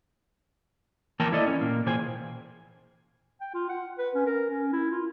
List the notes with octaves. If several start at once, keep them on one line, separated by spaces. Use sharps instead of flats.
E3 A#3 A#4 G5 A5
E4 A4 D5 D#5
C#4
A#2 A#3
A#2 E3 G#4 C5 G5 G#5
G5
F4
F#5
B4
C#4
A#4
C#4
E4
F4